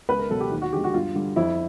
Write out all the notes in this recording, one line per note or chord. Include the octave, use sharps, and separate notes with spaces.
C#2 B4
A#4
B2 F#3 A4
G4
D#2
F#4
D3 F3 G#3 G4
F#4
G2 F4
D3 G3
F2 E4